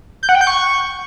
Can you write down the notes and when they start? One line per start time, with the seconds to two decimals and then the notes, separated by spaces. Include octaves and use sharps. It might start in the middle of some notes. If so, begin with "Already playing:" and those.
0.23 G6
0.29 F#5
0.35 G5
0.41 G6
0.47 C#6